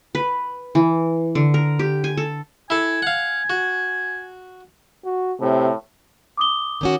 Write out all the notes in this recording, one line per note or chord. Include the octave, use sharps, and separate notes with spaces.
B4
E3
D3
A#4
G4
G#5
A4
E4 A4 G#5
F5 F#5
F#4
F#4
A2 C3
D6 D#6 G7
D#3 C#4 F#4